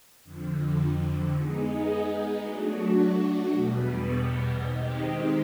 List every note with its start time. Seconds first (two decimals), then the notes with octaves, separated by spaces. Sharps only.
0.23 F2 D3 F3
1.33 G#3 B3 D#4 G#4
2.42 F#3 A3 D4 F#4
3.52 E2 B2 G3 B3
4.61 D#3 G#3 C4 D#4 G4